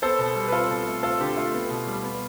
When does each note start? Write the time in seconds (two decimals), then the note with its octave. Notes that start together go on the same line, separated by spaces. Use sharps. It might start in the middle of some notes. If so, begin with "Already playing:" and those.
0.02 B3 A4 C5
0.19 B2
0.36 G3
0.48 B4
0.52 C4 F4 A4
0.70 B2
0.87 A3
1.03 C4 F4 A4
1.20 D3 G4
1.36 A3 F4
1.54 B3
1.70 B2
1.87 G3
2.03 B3